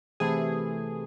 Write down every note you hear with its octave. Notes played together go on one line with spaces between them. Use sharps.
C3 E3 A3 G#4